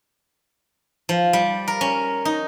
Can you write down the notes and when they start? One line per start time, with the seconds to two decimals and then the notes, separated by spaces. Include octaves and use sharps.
1.09 F3
1.33 G3
1.68 A#4
1.81 C#4
2.25 D#4